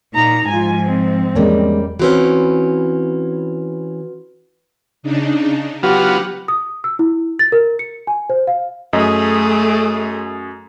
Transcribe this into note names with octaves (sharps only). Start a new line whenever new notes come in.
A#2 D#4 A#5
G#2 F3 F4 G#5
C4
E2 G3 G#3 A#3 C#4
E3 C4 C#4 F4 F#4 B4
C#3 D4 D#4
F#3 B3 F4 G4 F#5
D#6
E6
E4
A6
A#4
C#7
G#5
C5
F5
F#2 A3 G#4 D#5